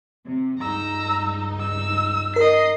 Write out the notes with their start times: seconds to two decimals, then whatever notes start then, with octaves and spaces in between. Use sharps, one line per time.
0.25 C3
0.58 C#2 G2 D#4 A#5 E6
1.60 E6
2.36 A#4 D#5 C7